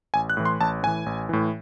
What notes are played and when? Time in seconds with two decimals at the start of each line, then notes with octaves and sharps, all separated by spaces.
0.14 A1 G#5
0.30 F#6
0.37 A2 E3
0.45 C6
0.60 A1 A5
0.83 A2 E3 G#5
1.06 A1
1.29 A2 E3